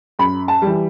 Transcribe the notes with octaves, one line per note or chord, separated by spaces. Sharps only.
F#2 B5
A5
E3 G3